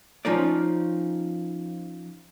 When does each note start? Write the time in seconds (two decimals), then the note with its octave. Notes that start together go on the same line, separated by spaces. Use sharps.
0.25 F3 C#4 D#4 F4 D5